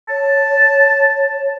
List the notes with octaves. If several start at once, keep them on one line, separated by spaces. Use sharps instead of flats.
C#5 A5